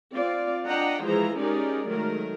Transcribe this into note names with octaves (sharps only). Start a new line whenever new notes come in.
C4 F4 D5 F5
D4 F4 D#5 F#5 G5 A#5
E3 F3 G#3 G#4 C5 A#5
G#3 C#4 D#4 G4 A#4 D5
D#3 F#3 G#3 A3 A#4